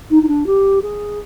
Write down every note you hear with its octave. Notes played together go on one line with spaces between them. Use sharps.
D#4
D#4
D4
G4
G#4